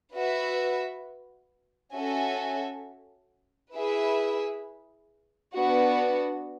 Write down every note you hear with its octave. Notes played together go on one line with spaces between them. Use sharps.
F#4 B4 E5
C#4 F#4 A4 E5 G#5
E4 G#4 B4 E5
B3 D4 F#4